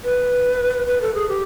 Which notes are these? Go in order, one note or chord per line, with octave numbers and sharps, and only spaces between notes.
B4
B4
A4
G#4
G4